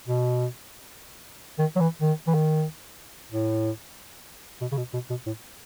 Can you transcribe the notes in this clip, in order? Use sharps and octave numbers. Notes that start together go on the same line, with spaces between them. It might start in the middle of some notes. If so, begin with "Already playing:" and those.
B2
D#3
F#3
E3
D#3
E3
D#3
A2
B2
C#3
B2
B2
B2
A2